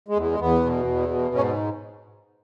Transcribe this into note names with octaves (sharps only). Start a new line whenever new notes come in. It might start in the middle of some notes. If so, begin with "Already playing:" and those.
G#3
E2
G#3
E2 B3
B2
E2
B2
G#2 C#4